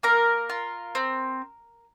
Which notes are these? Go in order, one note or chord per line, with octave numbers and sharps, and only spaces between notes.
A#3 A#4 A#5
F4
C4